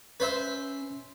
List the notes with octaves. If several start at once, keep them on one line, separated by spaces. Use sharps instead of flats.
C#4 B4 C5 E5